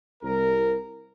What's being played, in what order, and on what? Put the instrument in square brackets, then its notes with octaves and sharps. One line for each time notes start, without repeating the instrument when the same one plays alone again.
[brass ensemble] C2 A#4